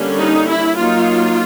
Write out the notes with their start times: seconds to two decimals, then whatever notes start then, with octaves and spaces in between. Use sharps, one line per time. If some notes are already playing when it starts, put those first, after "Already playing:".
Already playing: D3 G3 A#3 C#4
0.19 D#4
0.48 E4
0.77 F#3 A#3 D#4 F4